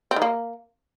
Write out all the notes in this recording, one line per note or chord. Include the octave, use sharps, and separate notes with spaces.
C4
D#3
A#3